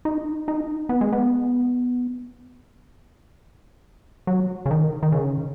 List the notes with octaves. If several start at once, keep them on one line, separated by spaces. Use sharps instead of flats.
D#4
D#4
B3
G#3
B3
F#3
C#3
D#3
D#3
C#3